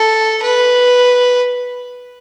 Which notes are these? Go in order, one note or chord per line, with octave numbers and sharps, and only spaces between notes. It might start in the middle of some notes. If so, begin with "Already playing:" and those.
Already playing: A4
B4